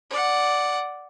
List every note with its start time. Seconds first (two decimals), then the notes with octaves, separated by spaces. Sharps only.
0.10 D5 F#5